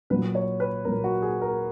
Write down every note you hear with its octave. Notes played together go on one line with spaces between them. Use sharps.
A#2 F#3 B4
C#5
B4
A#2 F#3 A#4
F#4
G#4
A#4